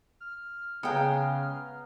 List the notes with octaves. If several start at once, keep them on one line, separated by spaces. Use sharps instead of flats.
F6
C#3 G#3 B3 F5 G5 A#5